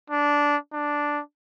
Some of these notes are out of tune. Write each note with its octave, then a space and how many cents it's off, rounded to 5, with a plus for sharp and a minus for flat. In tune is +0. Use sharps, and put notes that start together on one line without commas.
D4 -10
D4 +0